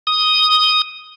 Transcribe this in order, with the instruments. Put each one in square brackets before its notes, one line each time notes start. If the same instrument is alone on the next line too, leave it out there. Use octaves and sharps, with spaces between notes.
[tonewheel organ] D#6